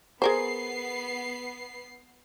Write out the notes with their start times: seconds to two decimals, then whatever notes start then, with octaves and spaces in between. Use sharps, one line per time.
0.22 B3 G#4 A#4 C5 C7